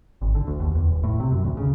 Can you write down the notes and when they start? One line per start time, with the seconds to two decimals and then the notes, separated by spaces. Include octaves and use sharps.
0.22 G#1
0.35 D3
0.47 D2
0.60 D#2
0.75 E2
0.89 D#1
1.03 A2
1.20 C3
1.32 F#2
1.44 D2
1.57 C#3